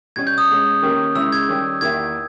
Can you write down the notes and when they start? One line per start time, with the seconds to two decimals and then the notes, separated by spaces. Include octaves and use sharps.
0.16 B2 G3 C#4 G#6
0.27 G6
0.38 D#6
0.49 B2 G#3 C#4
0.82 D#3 A#3 C#4 G4 A#4
1.15 C#3 G#3 C#4 E4 E6
1.32 G#6
1.49 D#3 G3 C#4 G4
1.81 E2 D#3 A#3 E4 G4 G#6